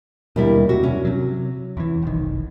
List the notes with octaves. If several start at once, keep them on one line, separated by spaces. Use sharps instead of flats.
D#2 B2 D3 G3 E4
C3 F#4
C#4
C3 F#3
E2 E3
F1 B1 D#3